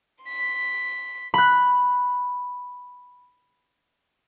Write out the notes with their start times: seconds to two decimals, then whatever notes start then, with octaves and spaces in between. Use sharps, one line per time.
0.24 C6 B6
1.34 B5 F#6